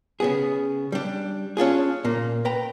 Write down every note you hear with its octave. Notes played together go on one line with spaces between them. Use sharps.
C#3 B3 G#4
G3 D4
C#4 D4 F4 G#4
A#2 A#3
B4 G5 A#5